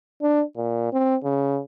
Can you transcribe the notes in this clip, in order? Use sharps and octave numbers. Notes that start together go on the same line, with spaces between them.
D4
A#2
C4
C#3